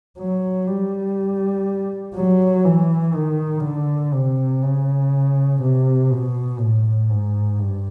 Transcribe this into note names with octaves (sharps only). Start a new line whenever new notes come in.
F#3
G3
F#3
E3
D#3
D3
C3
C#3
C3
B2
A2
G#2
G2